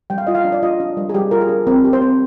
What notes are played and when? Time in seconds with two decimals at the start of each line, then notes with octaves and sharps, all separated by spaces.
0.10 G3 G5
0.18 F5
0.27 F4 D#5
0.35 F5
0.45 D4
0.52 D5
0.63 F4 D#5
0.80 D4
0.97 G3
1.09 G#4
1.14 G3 G4
1.31 F4 A#4
1.41 G#4
1.49 D4
1.67 C4 A#4
1.84 G4
1.93 C5
2.02 C4